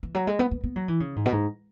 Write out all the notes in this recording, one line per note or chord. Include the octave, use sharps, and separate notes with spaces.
E3
F#3
G#3
B3
B3
B3
F#3
E3
C#3
G#2
B2
G#2